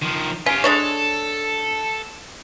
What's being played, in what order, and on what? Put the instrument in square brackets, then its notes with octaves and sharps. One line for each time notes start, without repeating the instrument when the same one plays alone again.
[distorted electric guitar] D#3 F3
[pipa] C#4 [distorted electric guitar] F4 G4
[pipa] G#3 D4 C#5 [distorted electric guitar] A4